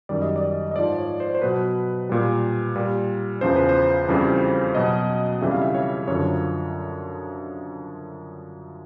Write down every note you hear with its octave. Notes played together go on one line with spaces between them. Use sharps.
F#2 D#3 G3 D5
D#5
D5
D#5
G#2 F3 D5
C#5
C5
C5
B2 F#3 B4
A#2 G3
A#2 G3
E2 C#3 F3 C5
B4
C5
F2 C#3 E3 G3
B2 F#3 D#5
F2 C#3 E3 G3 E5
F5
E5
C#5
F#2 D3 F3 C#5